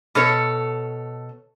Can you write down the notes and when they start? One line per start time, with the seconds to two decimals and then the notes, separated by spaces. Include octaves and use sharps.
0.15 B2 A4 C#5